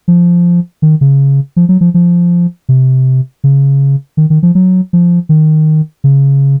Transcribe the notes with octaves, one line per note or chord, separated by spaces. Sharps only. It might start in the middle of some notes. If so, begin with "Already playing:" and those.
F3
D#3
C#3
F3
F#3
F3
F3
C3
C#3
D#3
D#3
F3
F#3
F3
D#3
C#3